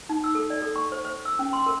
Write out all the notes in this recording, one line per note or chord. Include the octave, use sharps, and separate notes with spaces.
D#4
E6
A4
D5
A4
C#6
C5
C5
E6
C#4
C6
A#4